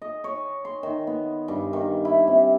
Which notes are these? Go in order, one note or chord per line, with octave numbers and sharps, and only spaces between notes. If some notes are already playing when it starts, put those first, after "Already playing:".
D#5
C#5
C6
D#3
B3
G2
D#3
E4
C3